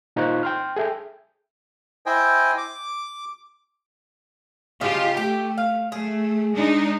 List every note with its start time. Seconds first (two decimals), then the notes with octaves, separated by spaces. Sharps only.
0.16 A#2 D#4 F4 C5 C#6 F#6
0.43 G5 C6 F6
0.76 G#4 A4 E5 G5
2.06 E4 C5 D#5 G5 G#5
2.57 D6
4.81 C#3 F3 D#4 F4 G4
5.17 A3 G4
5.58 F5
5.92 A3 G#4
6.54 G#3 D4 D#4